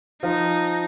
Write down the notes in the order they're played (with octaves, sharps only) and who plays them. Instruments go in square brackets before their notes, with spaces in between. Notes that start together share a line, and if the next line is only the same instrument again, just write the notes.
[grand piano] F3 [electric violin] D#4